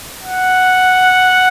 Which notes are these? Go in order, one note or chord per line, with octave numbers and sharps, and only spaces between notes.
F#5